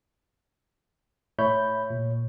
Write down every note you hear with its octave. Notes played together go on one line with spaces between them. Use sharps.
A2 C#5 E5 B5 G6
A#2